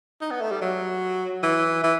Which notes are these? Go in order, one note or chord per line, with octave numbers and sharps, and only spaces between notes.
D#4
B3
A3
G3
F#3
E3
E3